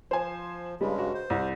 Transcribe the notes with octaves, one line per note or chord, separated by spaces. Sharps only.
F3 C5 G#5
G2 C#3 G3 G#3
F#4
C5
C2